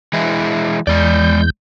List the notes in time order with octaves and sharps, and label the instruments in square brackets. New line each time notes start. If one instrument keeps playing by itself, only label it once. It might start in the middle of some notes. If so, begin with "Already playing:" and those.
[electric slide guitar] E3 G#3 E4
[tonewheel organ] E2 G6 [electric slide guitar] G#3 D5